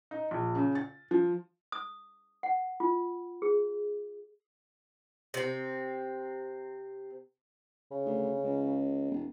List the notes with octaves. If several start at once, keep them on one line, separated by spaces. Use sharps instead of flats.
D#4
A#1
C#3
A6
F3
D#6
F#5
F4
G#4
C3 C4
C#3
D2
C#2
E1